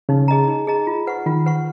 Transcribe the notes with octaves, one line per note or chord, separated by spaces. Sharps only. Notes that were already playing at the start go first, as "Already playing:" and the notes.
C#3 D#4
G#4 D#5 A#5
D#4
G#4 D#5 A#5
F4
B4 F#5 C#6
D#3 F4
B4 F#5 C#6